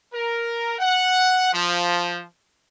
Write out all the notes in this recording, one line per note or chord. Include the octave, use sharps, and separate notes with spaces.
A#4
F#5
F3